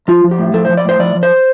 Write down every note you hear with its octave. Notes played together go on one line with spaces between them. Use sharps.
F3 F4
F3
G4
A2
F3 A4
C5
F3
D5
A2 C5
F3 D5
F3
C5